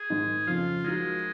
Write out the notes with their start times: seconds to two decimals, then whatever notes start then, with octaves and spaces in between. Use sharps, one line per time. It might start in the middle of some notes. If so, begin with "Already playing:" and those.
Already playing: G#4
0.10 G#2 D#3 G#3
0.47 F2 C#3 F3 F4
0.84 F3 G#3 A#3 D#4 F#4